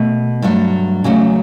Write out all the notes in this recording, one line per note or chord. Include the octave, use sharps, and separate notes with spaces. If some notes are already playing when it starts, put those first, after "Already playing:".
Already playing: B2 A3
G2 F#3 A3
E2 C#3 F#3 A3